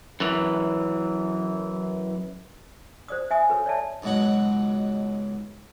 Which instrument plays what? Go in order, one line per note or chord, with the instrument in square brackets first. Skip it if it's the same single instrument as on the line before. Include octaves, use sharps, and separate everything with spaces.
[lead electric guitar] F#2 E3
[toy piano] C5 D5 D#6
E5 G#5 D#6
A4 B4 C#5
C#5 D5 E5 A5
[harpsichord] C#2 G#2 B2 F#3 F#5